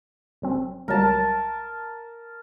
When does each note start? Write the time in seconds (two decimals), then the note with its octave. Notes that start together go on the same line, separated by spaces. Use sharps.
0.42 G1 F#3 C4
0.88 C#2 F#3 G3 A#4 A5